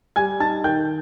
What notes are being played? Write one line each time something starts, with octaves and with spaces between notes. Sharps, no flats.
G3 G#5 G#6
D#4 A5 A6
D#3 G5 G6